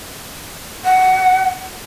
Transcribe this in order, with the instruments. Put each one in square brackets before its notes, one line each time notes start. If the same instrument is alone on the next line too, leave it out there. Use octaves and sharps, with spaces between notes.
[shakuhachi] F#5